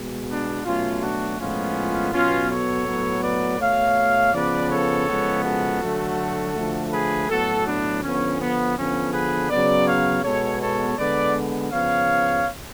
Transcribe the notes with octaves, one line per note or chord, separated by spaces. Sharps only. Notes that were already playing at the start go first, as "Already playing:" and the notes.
Already playing: B2 G#3
B3 D4
B2 F#3 A3 C#4 F4
D4 F#4
A2 F3 G#3 B3 C#4 F4
B2 F#3 B3 C#4 F4
A4 C#5
A2 F#3 B3
B4 D5
B2 A3 C#5 F5
C#3 F3 B3 B4 D5
A4 C#5
C#3 F3 G#3 B3
F#4 A4
D3 F#3 A3
D3 F3 A3
G#4 B4
A2 F#3 B3 F#4 A4
B3 D4
D3 F3 B3 C#4
B3
D3 F3 B3 C#4
G#4 B4
C#3 F#3 B3 B4 D5
C#5 F5
B2 G#3 B3 A4 C#5
A4 C#5
D3 G#3 B3 B4 D5
C#3 F3 B3 C#5 F5